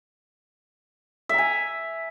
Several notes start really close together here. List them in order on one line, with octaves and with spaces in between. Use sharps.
E5 A#5 G#5